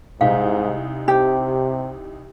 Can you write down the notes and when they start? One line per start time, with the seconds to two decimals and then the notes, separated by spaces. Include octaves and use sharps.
0.21 C2 G#2 D#4 F5
1.08 C3 G4